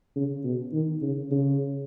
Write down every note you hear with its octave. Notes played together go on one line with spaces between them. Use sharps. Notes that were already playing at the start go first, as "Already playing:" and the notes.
C#3
B2
D#3
C#3
C#3